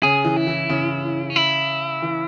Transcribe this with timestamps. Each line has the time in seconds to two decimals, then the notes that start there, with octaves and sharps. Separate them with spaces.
0.03 C#3 G#4
0.25 E3
0.37 E4
0.47 E3
0.70 C#3
1.30 C#4
1.36 E4
2.02 E3